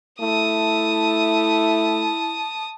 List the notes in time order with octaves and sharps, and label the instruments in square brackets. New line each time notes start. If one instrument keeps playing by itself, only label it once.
[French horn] A3 [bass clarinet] E4 [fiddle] A5 D#6